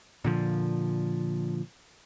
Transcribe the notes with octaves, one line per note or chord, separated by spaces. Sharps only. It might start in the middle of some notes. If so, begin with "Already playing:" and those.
A#2 D3 F3